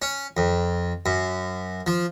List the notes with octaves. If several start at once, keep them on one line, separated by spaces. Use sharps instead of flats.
C#4
F2
F#2
F3